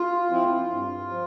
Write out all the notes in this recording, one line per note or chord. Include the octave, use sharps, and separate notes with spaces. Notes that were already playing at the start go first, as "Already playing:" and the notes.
Already playing: F4
F3 C4 E4
G2
F3